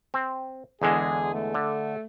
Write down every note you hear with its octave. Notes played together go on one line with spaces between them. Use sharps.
C4
E2 D3 G#3 G#4
A3
D3